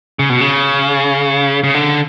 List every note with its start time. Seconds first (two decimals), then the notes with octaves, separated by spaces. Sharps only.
0.19 C#3
0.30 B2
0.41 C#3
1.64 C#3
1.74 D3